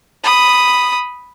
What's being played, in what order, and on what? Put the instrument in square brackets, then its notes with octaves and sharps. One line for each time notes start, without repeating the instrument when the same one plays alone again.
[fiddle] B5 D#6